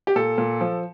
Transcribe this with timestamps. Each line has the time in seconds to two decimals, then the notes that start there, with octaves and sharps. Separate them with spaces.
0.07 G4
0.16 A#2 A4
0.38 A#2
0.61 F3